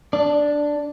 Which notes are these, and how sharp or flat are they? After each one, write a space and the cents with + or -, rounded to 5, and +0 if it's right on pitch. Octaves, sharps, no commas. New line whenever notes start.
D4 +0 D5 +0